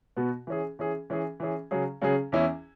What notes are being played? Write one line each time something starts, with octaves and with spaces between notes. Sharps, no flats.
B2 B3 F#4
E3 C#4 G#4
E3 C#4 G#4
E3 C#4 G#4
E3 C#4 G#4
C#3 F#3 C#4 G#4
C#3 F#3 C#4 G#4
E2 E3 C#4 E4